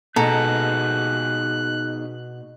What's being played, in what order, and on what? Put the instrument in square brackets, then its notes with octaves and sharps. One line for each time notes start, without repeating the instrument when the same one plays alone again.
[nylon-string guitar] B2 [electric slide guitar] B3 D#4 G#4 [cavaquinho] A4 A#5 [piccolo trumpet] F#6